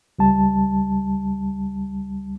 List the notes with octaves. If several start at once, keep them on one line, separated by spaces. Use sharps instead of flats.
C#2 G3 A5